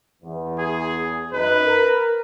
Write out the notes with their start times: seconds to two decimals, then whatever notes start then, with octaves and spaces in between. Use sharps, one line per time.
0.23 E2
0.59 G#4
1.33 F#2 D#4 B4
1.66 A#4